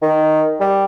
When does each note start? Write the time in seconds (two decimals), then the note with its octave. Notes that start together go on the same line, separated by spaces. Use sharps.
0.02 D#3
0.60 G3